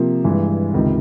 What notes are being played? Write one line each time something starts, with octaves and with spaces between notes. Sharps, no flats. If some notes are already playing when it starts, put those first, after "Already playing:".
Already playing: C3 F3 A#3
G2 E3 G#3
C#2 C3 D#3